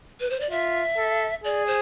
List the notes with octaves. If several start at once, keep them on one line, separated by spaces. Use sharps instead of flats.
B4
C5
D5
F4 E5
A4
G#4 D5
C5